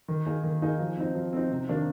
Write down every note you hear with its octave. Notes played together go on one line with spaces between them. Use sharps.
D#3
A#3 D#4 G#4
D#3
A#3 D#4 G#4
F3
C4 D#4
F3
C4 D#4
C3
D#3 A#3 D4